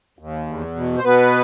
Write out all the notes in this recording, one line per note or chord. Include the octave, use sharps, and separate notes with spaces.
D#2
E2
B2
C5
B2 B3 B4